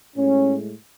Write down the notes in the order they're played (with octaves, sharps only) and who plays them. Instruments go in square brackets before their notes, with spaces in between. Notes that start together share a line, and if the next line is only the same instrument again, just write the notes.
[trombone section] A2 G#3 C#4